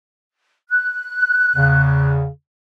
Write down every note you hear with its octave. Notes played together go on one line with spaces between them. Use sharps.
F#6
E2 C#3